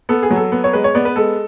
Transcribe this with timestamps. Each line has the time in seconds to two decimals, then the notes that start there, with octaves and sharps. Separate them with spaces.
0.09 B3 A4
0.23 G#4
0.31 F#3
0.36 A4
0.52 B3
0.64 C#5
0.73 G#3 B4
0.84 C#5
0.95 B3 D5
1.05 B4
1.16 G#3 A4